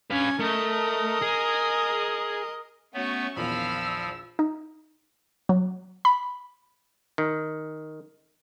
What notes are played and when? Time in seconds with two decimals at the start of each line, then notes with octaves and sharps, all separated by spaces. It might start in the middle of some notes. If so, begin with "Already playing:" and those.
0.11 C#4 B4 F5 G#5
0.40 A3 A#4 D#5
1.22 G#4
2.94 A3 B3 C#4 F#4 C#6
3.36 A#1 E2 D#3 F3 F5 B5 E6 F6
4.39 D#4
5.49 F#3
6.05 B5
7.18 D#3